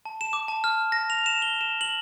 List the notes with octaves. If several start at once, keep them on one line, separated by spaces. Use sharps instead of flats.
A5
E7
D6
A5
F6
A#6
F7
E7
G7
E7
F#7